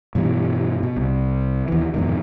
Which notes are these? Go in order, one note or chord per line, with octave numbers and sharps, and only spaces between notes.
G2 B2 E3 G3
B2
C2
D#2 E3
F2 G#2 B2 D#3